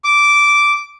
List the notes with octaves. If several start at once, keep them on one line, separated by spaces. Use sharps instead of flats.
D6